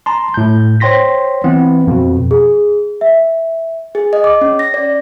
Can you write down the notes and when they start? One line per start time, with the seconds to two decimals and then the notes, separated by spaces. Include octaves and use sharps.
0.06 A5 A#5 C6
0.34 A2 G6
0.80 C5 C#5 G5 C6 A#6 B6
1.44 E3 B3 C4
1.87 F2 B2
2.31 G#4
3.01 E5
3.95 G#4
4.13 D#5
4.24 D6
4.41 C#4
4.59 A#6
4.74 D5